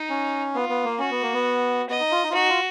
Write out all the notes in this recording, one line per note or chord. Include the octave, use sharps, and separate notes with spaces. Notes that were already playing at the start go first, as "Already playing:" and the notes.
Already playing: D#4
C#4
B3 F4
B3
A#3
C#4 F#4
B3
A#3
B3
B3 D#5
D#4
F4
D#4
F4
D#4 F#4
F4